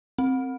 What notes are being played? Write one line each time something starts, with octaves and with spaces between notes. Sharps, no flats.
C4